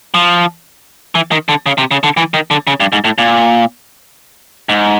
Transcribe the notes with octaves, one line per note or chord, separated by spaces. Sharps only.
F3
E3
D#3
D3
C#3
C3
C#3
D3
E3
D#3
D3
C#3
G2
G#2
A2
A#2
G#2